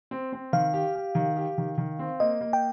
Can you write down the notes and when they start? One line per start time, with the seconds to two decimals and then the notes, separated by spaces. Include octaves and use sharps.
0.11 C4
0.33 C4
0.53 D#3 F5
0.73 G4
0.95 G4
1.15 D#3
1.37 G4
1.58 D#3
1.78 D#3
1.99 C4
2.20 A#3 D#5
2.41 A#3
2.53 G5